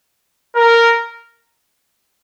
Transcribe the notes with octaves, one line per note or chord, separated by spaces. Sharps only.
A#4